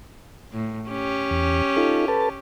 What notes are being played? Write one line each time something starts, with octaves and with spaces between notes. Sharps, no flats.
A2
C#4 G4
E2
D#4 F4 A4
A4 B4 A5